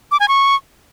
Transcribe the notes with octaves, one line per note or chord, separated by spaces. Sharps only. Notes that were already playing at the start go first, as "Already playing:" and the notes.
D6
G#5
C#6